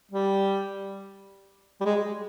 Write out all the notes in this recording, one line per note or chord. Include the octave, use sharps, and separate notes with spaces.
G3
G3
G#3